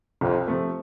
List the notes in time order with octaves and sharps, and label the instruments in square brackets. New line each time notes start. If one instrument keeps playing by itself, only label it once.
[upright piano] C2 [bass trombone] F2
[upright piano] C3 F3 A3